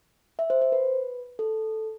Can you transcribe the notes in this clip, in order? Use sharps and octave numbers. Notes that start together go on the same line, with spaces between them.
E5
C5
C5
B4
A4